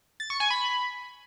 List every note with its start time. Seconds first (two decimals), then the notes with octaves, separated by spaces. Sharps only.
0.20 A6
0.30 C#6
0.40 G#5
0.50 B5